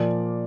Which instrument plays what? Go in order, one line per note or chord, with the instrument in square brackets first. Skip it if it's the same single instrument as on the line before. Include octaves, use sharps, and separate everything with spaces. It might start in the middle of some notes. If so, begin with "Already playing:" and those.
Already playing: [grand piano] A#2 F3 D5